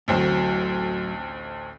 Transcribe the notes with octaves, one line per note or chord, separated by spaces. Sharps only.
A1 D2 A2 F#3 C4